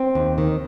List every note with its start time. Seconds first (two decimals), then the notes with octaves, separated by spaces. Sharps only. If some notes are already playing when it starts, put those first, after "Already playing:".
Already playing: C4
0.15 D#2
0.38 D#3